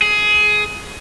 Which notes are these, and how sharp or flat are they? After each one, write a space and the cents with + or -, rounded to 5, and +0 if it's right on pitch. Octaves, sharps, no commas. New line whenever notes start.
G#4 +15